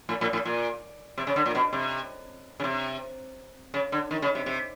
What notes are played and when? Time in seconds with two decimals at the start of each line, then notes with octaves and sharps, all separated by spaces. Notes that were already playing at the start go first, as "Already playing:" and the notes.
0.09 A2
0.21 A2
0.33 A2
0.45 A#2
1.18 C3
1.27 C#3
1.36 D3
1.46 A#2
1.55 B2
1.73 C3
2.60 C#3
2.64 C3
3.74 C#3
3.92 D3
4.11 D#3
4.22 C#3
4.35 C3
4.46 C3